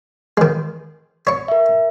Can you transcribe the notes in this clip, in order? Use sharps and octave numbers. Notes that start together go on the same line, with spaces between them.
D#3 G#3
C#5 C#6
A#4 E5